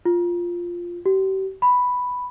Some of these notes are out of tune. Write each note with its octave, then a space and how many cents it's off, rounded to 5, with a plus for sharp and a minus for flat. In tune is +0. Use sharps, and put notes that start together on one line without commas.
F4 +0
G4 -40
B5 +0